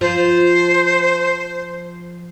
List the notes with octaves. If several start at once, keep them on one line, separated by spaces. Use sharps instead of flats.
F3 C5